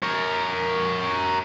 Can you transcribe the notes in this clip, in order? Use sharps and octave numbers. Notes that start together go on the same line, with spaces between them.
A#4 C#5